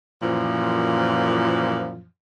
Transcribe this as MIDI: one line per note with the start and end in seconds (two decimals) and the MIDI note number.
0.22 2.05 42
0.22 2.05 46
0.22 2.05 52
0.22 2.05 53